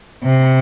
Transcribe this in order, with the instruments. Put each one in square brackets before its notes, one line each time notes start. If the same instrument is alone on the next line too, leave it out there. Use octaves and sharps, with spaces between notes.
[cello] C3